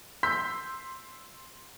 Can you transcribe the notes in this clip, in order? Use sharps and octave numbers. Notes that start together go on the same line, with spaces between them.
C6 E6 G6 B6